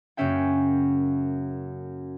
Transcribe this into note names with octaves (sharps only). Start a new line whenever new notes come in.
F#2 C#3 A#3 C#4 E5 G5